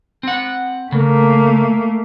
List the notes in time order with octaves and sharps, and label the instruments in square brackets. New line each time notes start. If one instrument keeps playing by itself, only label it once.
[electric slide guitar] C4 F#5
[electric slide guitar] C#3 [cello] A3 A#3